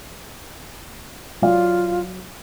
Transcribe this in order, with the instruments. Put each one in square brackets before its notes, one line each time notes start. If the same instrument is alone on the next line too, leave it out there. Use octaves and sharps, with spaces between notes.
[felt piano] F#3 D5 F5 [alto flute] F4